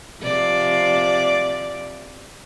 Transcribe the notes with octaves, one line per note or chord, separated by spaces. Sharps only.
C3 F3 D5